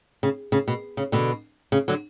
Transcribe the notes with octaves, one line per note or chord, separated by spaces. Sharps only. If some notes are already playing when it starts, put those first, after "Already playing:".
C#3
C#3
B2
C#3
B2 D3
C#3
D3 F#3